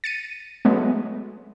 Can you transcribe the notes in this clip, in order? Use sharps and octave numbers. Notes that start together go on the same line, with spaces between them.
A6 C#7 D#7
F#3 G#3 A3 B3